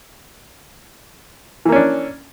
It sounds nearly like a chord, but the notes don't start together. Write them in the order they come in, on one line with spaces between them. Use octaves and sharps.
E3 A#3 C#4 D4